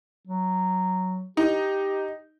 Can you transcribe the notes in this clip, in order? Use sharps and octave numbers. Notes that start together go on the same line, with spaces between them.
F#3
D#4 G4